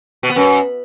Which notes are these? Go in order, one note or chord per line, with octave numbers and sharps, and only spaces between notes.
B2
B3
F#2